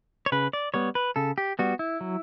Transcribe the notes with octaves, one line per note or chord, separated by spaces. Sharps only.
C#5
C#3 B4
D5
G3 B3 C#5
B4
C#3 A4
G4
G3 B3 F#4
E4
F#3